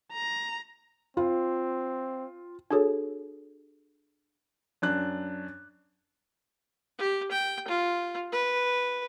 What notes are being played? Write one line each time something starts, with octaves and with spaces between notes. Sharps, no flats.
A#5
C4 F4
D4 F#4 G#4 A4 C#5
F#2 D4 F#6
G4
G5
F4
B4